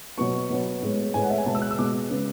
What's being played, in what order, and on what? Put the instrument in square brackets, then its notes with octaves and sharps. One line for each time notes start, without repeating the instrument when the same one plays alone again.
[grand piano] B2 F#3 B3 C#6
B2 F#3 B3
A2 G#3 B3
A2 G#3 B3 G#5
F#5
E5
G#5
B2 G#3 B3 A5
E6
F#6
E6
B2 G#3 B3 D6
C#3 G#3 B3